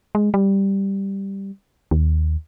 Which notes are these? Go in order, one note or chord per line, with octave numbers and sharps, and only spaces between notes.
G#3
G3
D#2